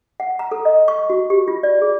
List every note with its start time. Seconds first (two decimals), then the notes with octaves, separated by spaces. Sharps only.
0.20 F#5
0.39 A#5
0.51 A4
0.65 D#5
0.88 C#6
1.10 F#4
1.30 G4
1.48 F4
1.63 D5
1.82 G#4